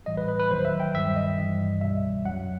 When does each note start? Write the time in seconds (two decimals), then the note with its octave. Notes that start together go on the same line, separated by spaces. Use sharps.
0.06 A2 E3 G3 D#5
0.17 B4
0.28 B4
0.40 B4
0.51 D#2 D#3 F#3 C5
0.65 E5
0.80 G5
0.94 G2 D#3 G3 E5
1.16 D#5
1.38 G2 E3 G3
1.81 C2 B2 G3 E5
2.25 F#2 F#3 F#5